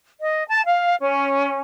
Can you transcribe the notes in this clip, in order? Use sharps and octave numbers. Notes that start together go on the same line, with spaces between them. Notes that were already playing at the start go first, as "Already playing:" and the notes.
D#5
A5
F5
C#4